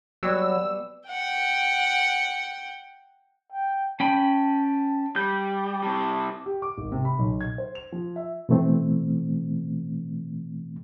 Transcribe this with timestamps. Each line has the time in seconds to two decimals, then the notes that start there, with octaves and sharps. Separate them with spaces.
0.23 B2 F#3 G3 B3 E6
1.09 F#5 G5
3.52 G5
4.00 C#4 G5 A5 B5
5.16 G3 G6
5.83 C3 G3 A5
6.46 G4
6.62 D6
6.78 G#1
6.92 C3
7.05 B5
7.19 B1
7.41 G#6
7.58 C5
7.75 F7
7.92 F3
8.16 E5
8.49 B2 E3 A3 C4